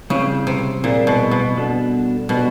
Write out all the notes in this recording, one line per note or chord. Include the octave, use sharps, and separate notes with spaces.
C#3 G3 C4 E4 G#4
C3
A#2 G3 C4 E4 G#4
B2
B2
G3 B3 D4 F#4 A4
B2 G3 B3 D4 F#4 A4